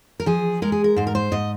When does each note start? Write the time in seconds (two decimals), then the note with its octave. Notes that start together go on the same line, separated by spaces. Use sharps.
0.20 A#4
0.26 F3 G#4
0.62 G#3 A#4
0.72 G#4
0.84 A#4
0.96 G#2 C5
1.07 A#4
1.15 C5
1.32 G#2 D#5